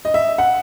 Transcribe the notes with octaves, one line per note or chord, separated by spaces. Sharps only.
D#5
E5
F#5